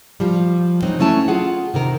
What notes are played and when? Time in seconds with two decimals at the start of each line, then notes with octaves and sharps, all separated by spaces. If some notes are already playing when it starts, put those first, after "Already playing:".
0.20 F3 G3
0.82 F#3 G#3 C4 D#4
0.99 F#3 A3 C#4 E4 A5
1.28 F4 G#4 F#5
1.74 C3 D#3 A#4